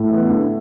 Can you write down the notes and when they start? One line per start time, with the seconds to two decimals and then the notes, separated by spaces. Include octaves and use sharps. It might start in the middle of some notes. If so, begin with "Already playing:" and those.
Already playing: A2
0.10 E3 B3
0.30 D3